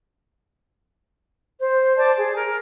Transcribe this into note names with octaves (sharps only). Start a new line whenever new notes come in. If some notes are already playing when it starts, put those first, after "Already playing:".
C5
C5 D5 A5
G#4
A#4